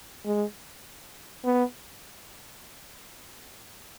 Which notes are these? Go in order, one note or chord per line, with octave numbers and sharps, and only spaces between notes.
G#3
B3